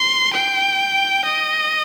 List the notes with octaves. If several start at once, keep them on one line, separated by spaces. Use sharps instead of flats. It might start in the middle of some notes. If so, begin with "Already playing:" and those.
Already playing: C6
G5
D#5